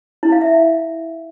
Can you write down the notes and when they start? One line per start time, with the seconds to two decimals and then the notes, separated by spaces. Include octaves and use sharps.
0.23 E4
0.32 F5
0.41 E5